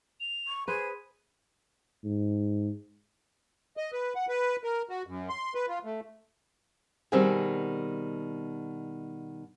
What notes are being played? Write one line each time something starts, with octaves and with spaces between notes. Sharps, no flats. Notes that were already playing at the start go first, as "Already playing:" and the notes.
F7
C#6
G#4 B4 C5 D#7
G#2
D#5
B4
F#5
B4
A#4
F#4
F#2
C6
B4
F4
A3
B2 D#3 G3 C4 G#4